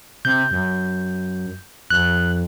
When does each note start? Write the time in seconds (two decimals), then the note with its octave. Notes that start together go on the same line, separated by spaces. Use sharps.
0.25 C3 G6
0.51 F#2
1.90 F2 F#6